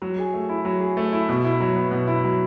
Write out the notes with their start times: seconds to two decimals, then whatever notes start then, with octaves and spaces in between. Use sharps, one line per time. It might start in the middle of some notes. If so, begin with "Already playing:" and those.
0.02 F#3
0.19 G#4
0.34 A3
0.49 E4
0.65 F#3
0.81 G#4
0.97 A3
1.13 E4
1.29 B2
1.44 E4
1.60 F#3
1.76 B3
1.91 B2
2.07 E4
2.24 F#3